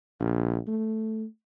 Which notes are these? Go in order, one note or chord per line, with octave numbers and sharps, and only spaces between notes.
A#1
A3